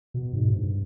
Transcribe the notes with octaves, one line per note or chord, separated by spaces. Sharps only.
B2
G#2
G2